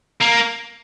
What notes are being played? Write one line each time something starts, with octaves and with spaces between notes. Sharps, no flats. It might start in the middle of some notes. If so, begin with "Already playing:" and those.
A#3